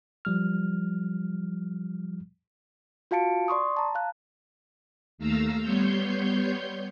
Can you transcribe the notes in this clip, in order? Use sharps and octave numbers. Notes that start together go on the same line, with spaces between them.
F3 G3 F6
F4 F#4 F5 A5 C#7 D7
D5 C6 C#6 D#6
A5 A#5
F5 F#6
D#2 A3 F5 A#5 E6
G3 B3 C#5 C6 G6